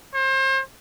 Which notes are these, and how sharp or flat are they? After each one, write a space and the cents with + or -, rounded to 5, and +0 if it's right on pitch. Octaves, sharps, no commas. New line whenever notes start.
C5 +35